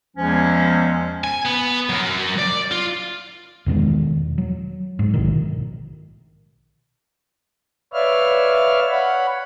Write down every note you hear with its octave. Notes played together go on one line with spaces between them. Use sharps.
E2 F3 G#3 C#4
G#5
B3
F#3 A#4
D5
F4
E2 B2 D#3 G#3
F#3
G#2
A#1 B2 D#3
B4 C#5 D5 E5 F5 F6
C#5 F#5 B5